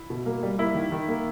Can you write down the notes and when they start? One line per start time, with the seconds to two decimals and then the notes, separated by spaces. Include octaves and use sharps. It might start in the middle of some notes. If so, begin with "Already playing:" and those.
Already playing: E4
0.10 B2
0.26 A#3
0.43 G3
0.58 A#3 E4
0.75 D#3
0.92 D#3
1.08 A#3